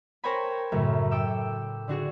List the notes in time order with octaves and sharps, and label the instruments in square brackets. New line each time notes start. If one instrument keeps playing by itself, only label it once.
[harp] A#4 C5 C#5 G5 G#5 B5
F#2 A2 C#3 A3
A4 G5 D6 E6
D3 D4 F#4 G#4